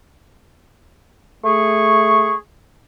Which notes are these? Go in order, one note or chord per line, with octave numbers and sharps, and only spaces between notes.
A3 G#4 C#6